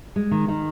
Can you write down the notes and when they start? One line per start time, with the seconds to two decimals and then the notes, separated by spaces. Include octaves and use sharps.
0.16 G#3
0.31 D#3
0.48 D#3